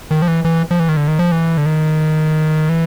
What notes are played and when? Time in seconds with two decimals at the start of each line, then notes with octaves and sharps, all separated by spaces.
0.11 D#3
0.22 F3
0.28 E3
0.45 E3
0.71 F3
0.80 E3
0.89 D#3
0.97 D3
1.08 D#3
1.19 F3
1.32 E3
1.57 D3
1.66 D#3
2.69 E3